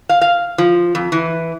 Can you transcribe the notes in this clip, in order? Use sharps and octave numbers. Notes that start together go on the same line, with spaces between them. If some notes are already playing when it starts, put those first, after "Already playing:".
F5
F5
F3
F2
E3